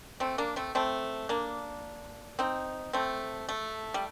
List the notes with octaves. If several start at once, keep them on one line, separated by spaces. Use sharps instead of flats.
A3 C4
A#3 D4
A3 C4
A3 C4
A#3 D4
C4 D#4
A3 C4
A3
G3